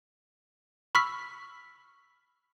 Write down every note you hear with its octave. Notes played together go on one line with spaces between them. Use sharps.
B5 C#6 E6 F6 B6